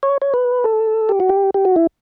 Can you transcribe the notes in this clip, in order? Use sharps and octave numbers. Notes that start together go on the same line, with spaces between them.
C#5
C#5
B4
A4
G4
F#4
G4
G4
F#4
E4